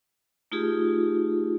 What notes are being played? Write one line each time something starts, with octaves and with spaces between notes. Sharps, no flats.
A3 D#4 F4 G4 G#4